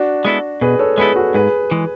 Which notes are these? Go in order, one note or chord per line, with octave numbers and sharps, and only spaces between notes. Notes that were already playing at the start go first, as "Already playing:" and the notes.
Already playing: D4 F#4
G#3 B3 E4 A4
B2 G#4 B4
A4 C#5
G#3 B3 E4 G#4 A4 B4
F#4 A4
G#2 G#4 B4
E3 G#3